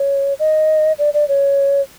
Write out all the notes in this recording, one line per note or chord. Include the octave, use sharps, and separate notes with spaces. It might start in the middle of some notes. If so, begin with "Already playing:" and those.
Already playing: C#5
D#5
D5
D5
C#5